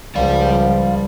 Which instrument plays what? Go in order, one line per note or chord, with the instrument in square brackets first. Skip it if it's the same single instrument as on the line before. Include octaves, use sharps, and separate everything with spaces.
[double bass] C#2 F3 [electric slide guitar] G3 D5 [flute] F5